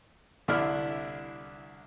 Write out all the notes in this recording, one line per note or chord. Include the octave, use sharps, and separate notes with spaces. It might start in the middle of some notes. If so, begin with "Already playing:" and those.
C2 D3 D4 E4 F6